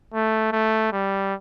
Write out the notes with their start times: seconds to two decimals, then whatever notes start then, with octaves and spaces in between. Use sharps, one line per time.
0.14 A3
0.53 A3
0.92 G3